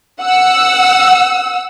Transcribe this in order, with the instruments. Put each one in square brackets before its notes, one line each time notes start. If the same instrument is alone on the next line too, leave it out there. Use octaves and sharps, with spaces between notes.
[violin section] F#5 E6